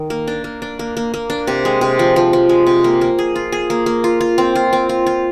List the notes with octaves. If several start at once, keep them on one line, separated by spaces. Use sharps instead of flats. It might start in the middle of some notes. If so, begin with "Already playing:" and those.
Already playing: D#3
A#3
D4
A#3
D4
A#3
A#3
A#3
D4
C3
G#3
C3
F3
F3
F3
G#3
C3
A#3
A#3
G#4
F4
G#4
A#3
A#3
F4
F4
C4
F4
C4
F4
F4